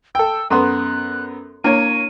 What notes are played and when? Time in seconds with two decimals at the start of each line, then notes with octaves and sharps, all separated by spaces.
0.15 A4 G5 E6
0.50 F#2 B3 A4 A#5 C6 F#6
1.64 A#3 D4 E4 C#5 D#7